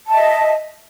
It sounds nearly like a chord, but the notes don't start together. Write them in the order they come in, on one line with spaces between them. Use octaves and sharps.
A5 E5 D#5